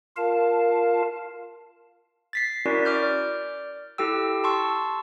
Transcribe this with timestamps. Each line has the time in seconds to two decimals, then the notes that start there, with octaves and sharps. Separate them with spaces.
0.17 F4 A#4 F5 A5
2.33 A6 B6 C7
2.66 C#4 E4 F#4 A#4 D5
2.85 D5 D6 F6 G6
3.98 E4 G4 A4 G5 E6
4.44 A5 C6 C#6 E6